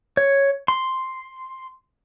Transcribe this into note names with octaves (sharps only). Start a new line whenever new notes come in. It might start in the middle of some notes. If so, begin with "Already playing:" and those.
C#5
C6